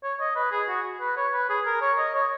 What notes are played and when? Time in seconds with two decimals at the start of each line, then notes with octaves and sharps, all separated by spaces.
0.04 C#5
0.20 D#5
0.36 B4
0.52 G#4
0.69 F#4
1.01 B4
1.17 C#5
1.34 B4
1.50 G#4
1.66 A#4
1.82 C#5
1.98 D#5
2.15 C#5